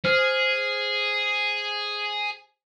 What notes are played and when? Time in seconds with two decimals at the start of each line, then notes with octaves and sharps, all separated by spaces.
0.04 G#4 C5 F6